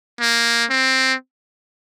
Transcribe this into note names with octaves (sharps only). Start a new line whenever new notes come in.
A#3
C4